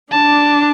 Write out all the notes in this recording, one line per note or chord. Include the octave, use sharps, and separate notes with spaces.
D4 A5